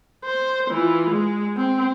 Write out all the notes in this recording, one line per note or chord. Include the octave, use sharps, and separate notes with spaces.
C5
E3 F4
G#3
C4